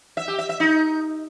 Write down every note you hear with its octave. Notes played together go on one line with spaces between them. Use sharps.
E5
G4
E5
E5
D#4